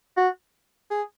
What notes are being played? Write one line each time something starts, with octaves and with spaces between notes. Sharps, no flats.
F#4
G#4